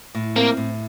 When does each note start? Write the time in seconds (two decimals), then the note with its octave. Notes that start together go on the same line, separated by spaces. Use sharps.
0.15 A2
0.36 A#3 C4
0.57 A2